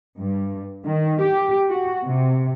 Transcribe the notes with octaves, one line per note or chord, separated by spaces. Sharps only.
G2
D#3
G4
F#4
C3